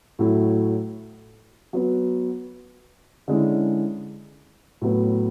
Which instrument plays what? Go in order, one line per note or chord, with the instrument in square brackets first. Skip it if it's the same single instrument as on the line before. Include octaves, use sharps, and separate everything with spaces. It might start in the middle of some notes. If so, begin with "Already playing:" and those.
[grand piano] A2 F#3 A3 E4
F#3 B3 F#4
D3 G#3 C#4 E4
A2 F#3 B3